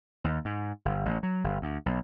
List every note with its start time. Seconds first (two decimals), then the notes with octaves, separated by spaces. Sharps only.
0.24 D#2
0.45 G#2
0.85 G1
1.05 A1
1.23 F#3
1.44 G1
1.62 D2
1.86 B1